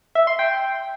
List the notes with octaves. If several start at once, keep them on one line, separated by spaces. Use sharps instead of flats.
E5
C6
G5